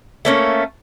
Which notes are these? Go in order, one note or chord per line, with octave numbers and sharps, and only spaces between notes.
A3 A#3 C#4